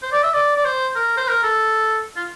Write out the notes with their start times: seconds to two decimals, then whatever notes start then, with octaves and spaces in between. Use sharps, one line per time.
0.02 C5
0.12 D5
0.23 E5
0.34 D5
0.56 D5
0.65 C5
0.96 A#4
1.17 C5
1.28 A#4
1.43 A4
2.16 F4